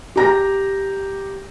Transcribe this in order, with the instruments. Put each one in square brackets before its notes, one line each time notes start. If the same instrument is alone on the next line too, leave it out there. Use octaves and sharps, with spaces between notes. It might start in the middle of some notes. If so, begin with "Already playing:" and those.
[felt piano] G4 A#5 A#6